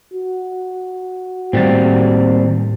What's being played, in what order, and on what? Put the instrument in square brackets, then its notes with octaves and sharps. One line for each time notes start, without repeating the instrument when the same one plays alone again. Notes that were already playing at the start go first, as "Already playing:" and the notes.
[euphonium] F#4
[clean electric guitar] D#2 G3 C4 [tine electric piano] A2 A6